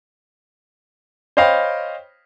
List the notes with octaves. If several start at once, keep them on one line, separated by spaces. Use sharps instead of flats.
C5 C#5 D#5 F5 G5 B5